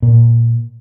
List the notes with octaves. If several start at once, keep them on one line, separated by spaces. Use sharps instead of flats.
A#2